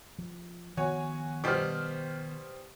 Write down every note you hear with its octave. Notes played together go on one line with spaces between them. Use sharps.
F3
D#3 F3 B3 F#4 C#5 G#5
B2 G3 G4 C5 F6